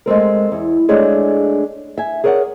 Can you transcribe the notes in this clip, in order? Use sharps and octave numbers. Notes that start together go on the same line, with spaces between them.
G#3 A3 C4 A#4
E2
G#3 A3 D4 G#4 C#5 E5
E5 G#5
G#4 A#4 C#5 D5 F#5